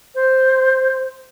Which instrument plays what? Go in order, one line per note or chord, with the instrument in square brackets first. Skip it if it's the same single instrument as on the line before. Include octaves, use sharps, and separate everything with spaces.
[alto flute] C5